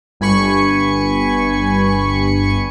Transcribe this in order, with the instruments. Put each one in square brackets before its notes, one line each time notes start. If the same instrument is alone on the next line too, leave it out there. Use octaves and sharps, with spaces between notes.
[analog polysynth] G1 G2 G#5 B5 C#6 C#7